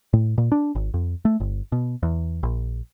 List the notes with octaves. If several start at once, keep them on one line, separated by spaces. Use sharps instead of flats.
A2
A#2
D4
G#1
F2
A3
G1
B2
E2
A#1